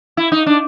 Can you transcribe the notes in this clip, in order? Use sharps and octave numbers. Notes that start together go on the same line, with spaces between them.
E4
D#4
D4